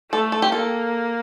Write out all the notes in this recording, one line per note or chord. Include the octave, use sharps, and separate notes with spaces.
A3 A4
A4
G4
A#3 A4